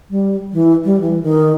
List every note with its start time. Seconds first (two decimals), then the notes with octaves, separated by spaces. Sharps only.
0.10 G3
0.53 E3
0.84 G3
1.01 E3
1.23 D#3